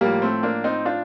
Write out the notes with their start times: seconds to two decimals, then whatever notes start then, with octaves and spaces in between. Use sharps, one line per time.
0.01 A2 F3 G3 A#3
0.22 A3 C4
0.43 A#3 D4
0.64 C4 D#4
0.85 D4 F4